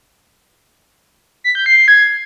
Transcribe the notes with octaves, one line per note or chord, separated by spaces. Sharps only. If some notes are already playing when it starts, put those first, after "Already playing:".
B6
G6
C7
C7
G#6